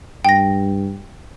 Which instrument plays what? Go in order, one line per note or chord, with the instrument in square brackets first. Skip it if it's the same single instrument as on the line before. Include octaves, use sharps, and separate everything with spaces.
[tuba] G2 [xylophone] G5 A#6